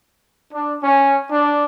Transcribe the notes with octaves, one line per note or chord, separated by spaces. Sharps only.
D4
C#4
D4